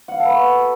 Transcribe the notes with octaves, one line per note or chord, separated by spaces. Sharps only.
F#5
F5
A4
B4
F#4